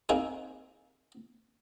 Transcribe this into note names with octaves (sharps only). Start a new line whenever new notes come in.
A#3 C4 D#4 G#4